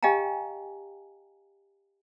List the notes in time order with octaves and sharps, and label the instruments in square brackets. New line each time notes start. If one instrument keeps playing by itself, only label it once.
[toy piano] G4 D#5 F5 G5 G#5 A#5